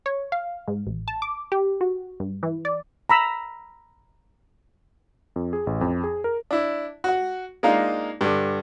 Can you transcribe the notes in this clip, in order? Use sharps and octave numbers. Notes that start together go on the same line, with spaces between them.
C#5
F5
G#2
A1
A5
D6
G4
F#4
G2
E3
D5
A#5 B5 E6
F2
G#4
A1
F2
G#4
A#4
D4 E4
F#4 F#5
G#3 A#3 D4 D#4 F4
G2 D3